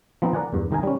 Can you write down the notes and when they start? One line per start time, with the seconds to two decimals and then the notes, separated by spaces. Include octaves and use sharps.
0.22 F3 B3 C4 D#4 D#5
0.33 A#4 D5 F#5 G#5
0.53 E2 G2
0.71 C2 D#3 D#4 A#4 G#5 A#5
0.83 G3 C#4